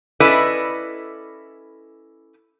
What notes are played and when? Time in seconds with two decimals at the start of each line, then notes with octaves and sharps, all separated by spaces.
0.20 C#4 E4 A4 B4 D5 D#5